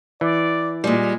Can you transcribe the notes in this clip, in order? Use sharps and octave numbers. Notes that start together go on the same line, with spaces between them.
E3 D5
A#2 G3 G#3